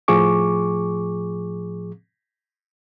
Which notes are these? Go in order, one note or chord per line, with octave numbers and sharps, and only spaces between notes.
A2 F3 G#4 C#6 D6